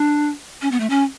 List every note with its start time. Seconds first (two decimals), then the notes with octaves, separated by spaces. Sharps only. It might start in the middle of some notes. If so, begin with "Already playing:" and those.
Already playing: D4
0.62 C#4
0.71 B3
0.80 A3
0.90 C#4